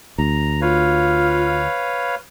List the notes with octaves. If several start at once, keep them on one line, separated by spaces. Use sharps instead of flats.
D2 A#5
F4 B4 C#5 F5